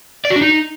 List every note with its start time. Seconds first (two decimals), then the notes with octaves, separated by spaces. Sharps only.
0.25 D5
0.30 F#4
0.36 D4
0.41 D#4